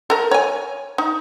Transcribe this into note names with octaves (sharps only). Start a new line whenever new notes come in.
A4 A#4
C#5 G#5
D#4